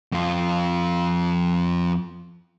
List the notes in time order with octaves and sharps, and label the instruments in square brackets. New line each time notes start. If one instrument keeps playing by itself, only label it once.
[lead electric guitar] F2 F4